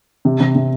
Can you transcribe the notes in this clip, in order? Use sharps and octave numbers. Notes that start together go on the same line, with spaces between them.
C3
C3
C3